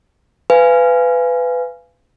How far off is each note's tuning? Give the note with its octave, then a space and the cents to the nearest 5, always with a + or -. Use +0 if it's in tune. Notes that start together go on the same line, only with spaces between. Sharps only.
B4 +20 F5 -25 G#5 +0